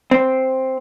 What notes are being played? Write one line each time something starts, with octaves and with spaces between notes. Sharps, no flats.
C4